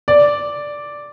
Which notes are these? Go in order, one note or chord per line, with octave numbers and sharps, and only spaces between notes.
D5